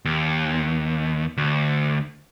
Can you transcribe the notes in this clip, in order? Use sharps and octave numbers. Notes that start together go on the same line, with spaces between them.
D#2
D2